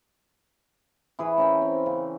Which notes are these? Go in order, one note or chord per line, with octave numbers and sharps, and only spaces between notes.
E3 G#4 B4
C#4 A#4 G5
C4
C#3